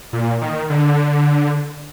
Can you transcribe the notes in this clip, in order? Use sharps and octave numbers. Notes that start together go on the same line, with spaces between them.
A#2
D#3
D3